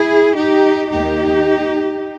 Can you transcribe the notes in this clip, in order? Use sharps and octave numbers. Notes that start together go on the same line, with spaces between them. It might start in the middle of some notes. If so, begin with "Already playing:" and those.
Already playing: E4 G#4
D#4 G4
D#2 D#3 A#3 D#4 G4